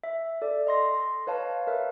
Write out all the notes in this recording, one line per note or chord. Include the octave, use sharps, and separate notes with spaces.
E5
A4 D5
D#5 C6 A#6
B4 C#5 F5 A5
A#4 B4 E5